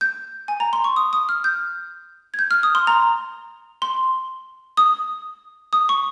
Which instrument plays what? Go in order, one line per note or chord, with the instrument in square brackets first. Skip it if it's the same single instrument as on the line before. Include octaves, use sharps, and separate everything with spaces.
[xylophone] G6
G#5
A#5
C6
C#6
D#6
D#6
F6
G6
G#6
G6
F6
D#6
C6
A#5
C6
D#6
D#6
C#6